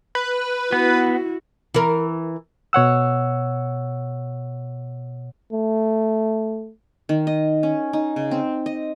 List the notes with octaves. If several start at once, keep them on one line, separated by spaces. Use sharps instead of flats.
B4
B3 E4 F#4
E3 A#4
B2 C#5 F#5 E6
A3
D#3
D#5
C#4
D#4
C#3
C4
D#5